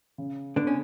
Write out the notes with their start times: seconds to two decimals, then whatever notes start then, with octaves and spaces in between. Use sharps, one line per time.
0.18 C#3
0.56 D3 B3 D4
0.67 C#4